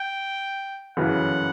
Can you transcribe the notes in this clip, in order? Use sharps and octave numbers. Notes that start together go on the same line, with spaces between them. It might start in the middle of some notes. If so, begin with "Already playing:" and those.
Already playing: G5
G1 F#2 C#3 E3 F#5